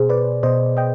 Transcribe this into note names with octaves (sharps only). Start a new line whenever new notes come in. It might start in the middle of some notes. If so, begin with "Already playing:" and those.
Already playing: B2 G#4 C5
B4 D5
B2 C5 D#5
D#5 G5